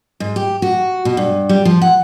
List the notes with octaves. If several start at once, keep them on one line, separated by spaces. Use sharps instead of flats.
G#2
G4
F#4
B2
G2
G3
F3
F#5